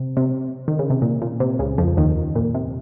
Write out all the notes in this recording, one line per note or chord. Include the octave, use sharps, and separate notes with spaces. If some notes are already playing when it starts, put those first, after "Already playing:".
Already playing: C3
C3
D#3
C#3
C3
A#2
A#2
C3
C#2 C#3
F2 F3
D#2 D#3
A#2
C3